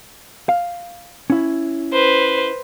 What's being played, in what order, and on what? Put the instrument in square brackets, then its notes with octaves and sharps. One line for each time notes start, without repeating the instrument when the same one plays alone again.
[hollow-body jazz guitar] F5
C#4 E4
[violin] B4 C5